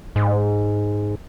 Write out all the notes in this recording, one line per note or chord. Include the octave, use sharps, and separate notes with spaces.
G#2